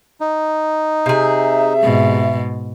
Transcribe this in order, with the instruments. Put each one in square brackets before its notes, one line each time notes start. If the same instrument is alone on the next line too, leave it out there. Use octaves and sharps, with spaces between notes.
[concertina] D#4
[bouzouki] C3 G#4 [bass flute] E5
[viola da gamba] G#2 B2